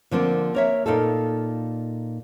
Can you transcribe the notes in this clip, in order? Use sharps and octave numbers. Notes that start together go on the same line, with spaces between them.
D3 F3 A#3 C4
A#3 C#5 E5
A#2 D#4 F4 A4